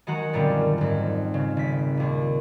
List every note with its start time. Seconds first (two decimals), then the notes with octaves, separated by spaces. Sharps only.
0.07 D#3 G#3 F#4 F#5 A#5
0.33 F#2 A#2 D3 G3 C4 C#4
0.78 F2 G#2
1.34 C#3
1.57 G#1 B6
1.97 D#2 A#2